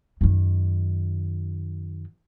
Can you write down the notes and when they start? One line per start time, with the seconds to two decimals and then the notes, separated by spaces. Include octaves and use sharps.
0.21 F#2 D#3